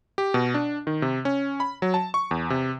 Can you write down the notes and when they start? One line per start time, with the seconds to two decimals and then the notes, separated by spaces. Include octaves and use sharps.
0.18 G4
0.34 B2
0.54 D4
0.87 D#3
1.02 C3
1.25 C#4
1.60 B5
1.82 F#3
1.94 A5
2.14 C#6
2.31 E2
2.50 C3